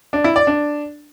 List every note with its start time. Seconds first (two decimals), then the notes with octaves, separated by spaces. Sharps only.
0.13 D4
0.24 E4
0.36 D5
0.47 D4